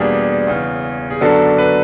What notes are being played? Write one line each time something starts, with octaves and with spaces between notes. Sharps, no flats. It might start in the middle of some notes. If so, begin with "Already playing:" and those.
Already playing: E2 B2 G3 A#3 D4 G#4
E2 C#3 E3
G#4
F#2 D3 F#3 B3 D4 A4
B4